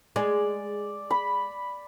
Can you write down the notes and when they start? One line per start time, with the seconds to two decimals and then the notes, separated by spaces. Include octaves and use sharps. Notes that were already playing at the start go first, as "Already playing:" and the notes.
0.16 G#3 D5
1.11 B5